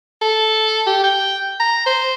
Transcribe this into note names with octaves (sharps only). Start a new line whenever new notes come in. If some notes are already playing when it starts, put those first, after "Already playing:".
A4
G4
G5
A#5
C5